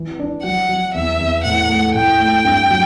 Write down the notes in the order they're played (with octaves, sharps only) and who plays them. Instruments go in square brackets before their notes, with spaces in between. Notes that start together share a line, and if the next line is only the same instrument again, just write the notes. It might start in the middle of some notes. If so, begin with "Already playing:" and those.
Already playing: [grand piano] E3
D4
[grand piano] F#3 [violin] F#5
[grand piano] F#3
[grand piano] E2 [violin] E5
[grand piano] E2
[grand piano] A2 [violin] F#5
[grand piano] A3
[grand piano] A2 [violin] G5
[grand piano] A3
G2
F#3